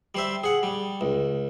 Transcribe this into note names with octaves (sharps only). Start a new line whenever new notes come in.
G3 C5 E5
G#4 F#5
G3
C#2